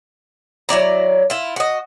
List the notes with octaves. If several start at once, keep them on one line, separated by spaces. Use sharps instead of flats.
F#3 E4 D5 A#5
E4 F4
F#4 D#5